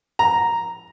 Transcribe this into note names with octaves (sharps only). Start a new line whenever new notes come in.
A#5